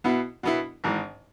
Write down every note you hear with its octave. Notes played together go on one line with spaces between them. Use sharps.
B2 B3 E4
B2 B3 E4
G#1 G#2 E3